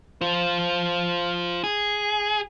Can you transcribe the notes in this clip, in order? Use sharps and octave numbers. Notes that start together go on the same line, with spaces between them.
F4 C5
G#4